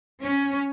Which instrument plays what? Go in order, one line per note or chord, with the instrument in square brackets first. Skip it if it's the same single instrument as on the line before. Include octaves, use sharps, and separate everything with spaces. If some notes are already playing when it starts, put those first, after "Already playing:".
[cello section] C#4